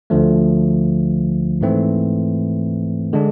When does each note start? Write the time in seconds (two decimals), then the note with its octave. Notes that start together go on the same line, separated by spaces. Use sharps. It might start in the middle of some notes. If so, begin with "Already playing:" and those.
0.10 D2 D3 F3 A3
1.61 G#2 E3 A3 C4
3.13 D3 G#3 D4